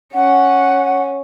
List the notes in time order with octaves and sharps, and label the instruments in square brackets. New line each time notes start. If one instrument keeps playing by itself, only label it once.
[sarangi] C#4 [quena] F#5